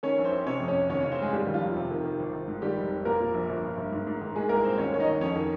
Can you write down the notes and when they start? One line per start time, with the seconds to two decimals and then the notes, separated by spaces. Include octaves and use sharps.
0.03 D#3 C#4 C#5
0.18 A#1
0.24 C4 C5
0.32 A#1
0.46 C3 C#4 C#5
0.60 F2
0.68 C#4 C#5
0.76 C3
0.89 D#2 C#4 C#5
1.00 C#3 C#4 C#5
1.12 C4 C5
1.19 C#3 G#3 G#4
1.33 D#2 G3 G4
1.47 D#2
1.54 F3 F4
1.61 F1
1.77 C3
1.91 D#3
2.04 D#3
2.20 G#1
2.33 G#1
2.48 G#2
2.62 D#3 G3 G4
2.77 F1
2.92 F1
3.05 A#2 A#3 A#4
3.21 A#2
3.34 A#1
3.49 G1
3.64 G2
3.78 G1
3.92 G#2
4.07 G#2
4.22 D#3
4.35 A#2 G#3 G#4
4.49 C2 A#3 A#4
4.64 C2 C4 C5
4.78 D#2 C#4 C#5
4.93 D#3 C#5
5.00 D#4 D#5
5.08 D#2
5.21 F2 C#4 C#5
5.36 D#3